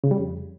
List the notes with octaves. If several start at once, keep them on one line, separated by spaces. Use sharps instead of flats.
C#3
G3
F2